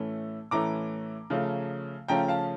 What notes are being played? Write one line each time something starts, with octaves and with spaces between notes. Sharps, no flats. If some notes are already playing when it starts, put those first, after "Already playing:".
Already playing: A2 E3 A3 C#4
A2 E3 A3 C#4 A#5 D6
C#3 F3 A3 C#4
C#3 F3 A3 C#4 G5 A#5
F5 A5